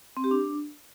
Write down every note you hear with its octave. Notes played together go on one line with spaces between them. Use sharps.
C4
G4
D4